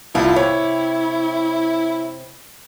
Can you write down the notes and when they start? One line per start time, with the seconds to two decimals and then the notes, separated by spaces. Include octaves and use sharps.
0.15 C2 E4 F4 F5 A5
0.36 C3 C#5